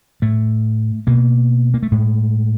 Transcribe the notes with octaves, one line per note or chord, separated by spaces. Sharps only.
A2 A3
B2 A#3
A#3
A3
A2 G#3